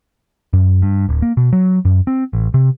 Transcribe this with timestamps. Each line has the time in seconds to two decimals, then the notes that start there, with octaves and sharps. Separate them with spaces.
0.53 F#2
0.82 G2
1.09 D1
1.22 A#3
1.37 B2
1.53 F#3
1.85 F#2
2.07 C4
2.33 A1
2.54 C3